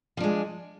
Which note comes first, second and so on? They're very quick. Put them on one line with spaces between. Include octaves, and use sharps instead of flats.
F3 D4 G#3